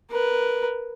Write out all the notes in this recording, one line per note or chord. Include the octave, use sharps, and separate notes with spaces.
A#4 B4